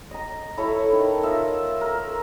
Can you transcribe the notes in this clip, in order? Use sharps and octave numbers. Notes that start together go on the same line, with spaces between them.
D#5 A#5
E4 A4 C#5
D#3
F4 D#5 E5
A#4